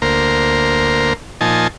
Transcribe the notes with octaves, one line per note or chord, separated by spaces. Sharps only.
D2 A#3 A#4 C5
A#2 F3 D#4 G#5 A5